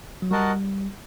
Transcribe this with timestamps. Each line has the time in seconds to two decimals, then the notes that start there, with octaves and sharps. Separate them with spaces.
0.22 F#3
0.31 G3 F#4 A#4 D#5 F#5 A5